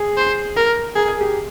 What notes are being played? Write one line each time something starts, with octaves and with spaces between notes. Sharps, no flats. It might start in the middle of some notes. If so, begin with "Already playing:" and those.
Already playing: G#4
C5
A#4
G#4 A#4
G#4
G4